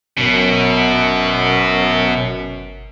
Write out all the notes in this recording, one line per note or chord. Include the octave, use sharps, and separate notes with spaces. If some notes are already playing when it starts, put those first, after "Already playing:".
G1 F#2 B2